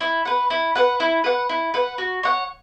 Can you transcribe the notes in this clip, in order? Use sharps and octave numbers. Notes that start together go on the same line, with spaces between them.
E4
B4 F#5
E4
B4 F#5
E4
B4 F#5
E4
B4 F#5
F#4
C#5 F#5